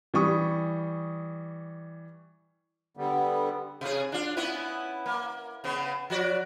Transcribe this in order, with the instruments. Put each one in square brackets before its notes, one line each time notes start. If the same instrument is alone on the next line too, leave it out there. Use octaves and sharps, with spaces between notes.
[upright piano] E3 G3 C#6 D#6
[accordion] D3 G3 B3
[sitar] C3 G#4
D4 F4
B3 C#4 E4
A#3
C#3 B3 C#4
F3 F#4 D5